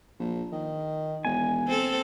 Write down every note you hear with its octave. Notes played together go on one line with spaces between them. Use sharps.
A#1
D#3
E1 G#5
C4 A4